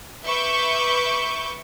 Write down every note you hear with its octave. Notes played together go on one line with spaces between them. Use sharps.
B4 E5 C#6 D6 G6